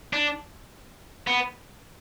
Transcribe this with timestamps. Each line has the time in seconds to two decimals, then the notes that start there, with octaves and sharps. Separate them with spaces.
0.13 D4
1.27 B3